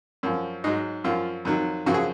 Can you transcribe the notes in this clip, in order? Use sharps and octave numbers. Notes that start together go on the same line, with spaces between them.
F#2 F3
G#2 F#3 D#4
F#2 F3 F4
F2 D#3 F#3
F#2 C#3 F3 F#4
G#4